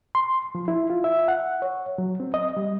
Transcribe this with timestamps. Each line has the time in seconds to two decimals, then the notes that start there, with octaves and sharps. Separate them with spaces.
0.15 C6
0.55 F3
0.68 E4
0.90 F4
1.04 E5
1.28 F#5
1.62 C#5
1.98 F#3
2.20 C4
2.34 D#5
2.57 G3